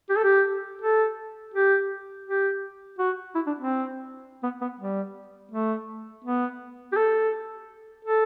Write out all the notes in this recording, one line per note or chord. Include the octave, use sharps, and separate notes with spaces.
G4
A4
G4
A4
G4
G4
F#4
E4
D4
C4
B3
B3
G3
A3
B3
G4
A4
A4